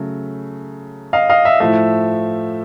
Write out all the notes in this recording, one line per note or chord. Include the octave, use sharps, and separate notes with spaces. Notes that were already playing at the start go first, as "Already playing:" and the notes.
Already playing: C#3 F#3 A3
D#5 F5
D#5 F5
E5
A2 F3 A3 E5